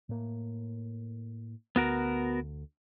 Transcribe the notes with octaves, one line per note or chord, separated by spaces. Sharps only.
A2 A#3
D2 B3 F#4 A#4